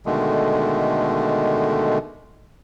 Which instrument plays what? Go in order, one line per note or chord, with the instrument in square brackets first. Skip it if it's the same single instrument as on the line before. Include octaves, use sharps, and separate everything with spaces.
[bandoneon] B2 D3 D#3 G#3 A3